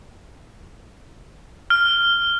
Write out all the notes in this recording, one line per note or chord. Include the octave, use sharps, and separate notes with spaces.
F6